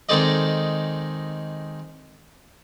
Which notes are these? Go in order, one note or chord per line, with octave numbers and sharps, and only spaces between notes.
D#3 G#3 C4 A4 D5 D#5